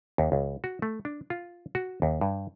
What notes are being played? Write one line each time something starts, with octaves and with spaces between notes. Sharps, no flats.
D#2
C#2
F#4
A3
D4
F4
F#4
D#2
G2